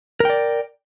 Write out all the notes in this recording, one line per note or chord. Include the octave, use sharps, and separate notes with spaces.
A#4 D5 G5